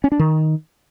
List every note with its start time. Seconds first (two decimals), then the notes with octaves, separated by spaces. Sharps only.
0.04 C#4
0.12 D4
0.19 D#3